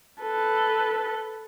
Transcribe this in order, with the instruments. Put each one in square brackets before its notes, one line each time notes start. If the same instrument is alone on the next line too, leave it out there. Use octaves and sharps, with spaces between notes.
[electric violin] A4 B4